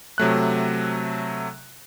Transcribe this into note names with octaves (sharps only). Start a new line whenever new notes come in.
C3 F#3 A3 F#6